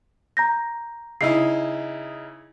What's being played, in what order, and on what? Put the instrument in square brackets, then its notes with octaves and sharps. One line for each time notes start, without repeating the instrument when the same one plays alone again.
[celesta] A#5 G6 A#6
[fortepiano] C#3 D#4 E4 [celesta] C7